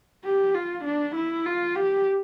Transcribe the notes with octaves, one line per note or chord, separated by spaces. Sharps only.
G4
F4
D4
E4
F4
G4